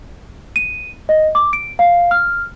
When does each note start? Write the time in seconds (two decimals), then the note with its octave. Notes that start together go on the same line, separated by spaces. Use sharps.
0.56 D#7
1.09 D#5
1.35 D6
1.53 D7
1.79 F5
2.11 F6